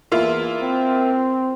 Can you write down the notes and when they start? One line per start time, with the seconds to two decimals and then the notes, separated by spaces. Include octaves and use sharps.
0.12 E2 A#3 E4 F4
0.62 C4